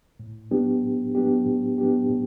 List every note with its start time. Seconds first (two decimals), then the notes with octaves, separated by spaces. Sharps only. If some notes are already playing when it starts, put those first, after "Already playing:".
0.20 A2
0.51 F#3 B3 D4 G4
0.83 A2
1.15 F#3 B3 D4 G4
1.46 A2
1.78 F#3 B3 D4 G4
2.10 A2